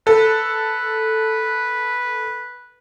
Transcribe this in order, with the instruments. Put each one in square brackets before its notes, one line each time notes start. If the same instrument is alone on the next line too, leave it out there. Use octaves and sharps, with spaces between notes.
[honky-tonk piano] A4 [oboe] B4